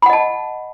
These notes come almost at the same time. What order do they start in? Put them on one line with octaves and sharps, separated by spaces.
B5 F#5 D#5 A5